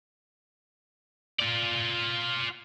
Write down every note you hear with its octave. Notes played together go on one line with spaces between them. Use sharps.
F4 D5